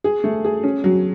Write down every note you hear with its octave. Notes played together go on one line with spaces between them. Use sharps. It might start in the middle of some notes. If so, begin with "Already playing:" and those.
G#4
A3
G#4
C#4
F#3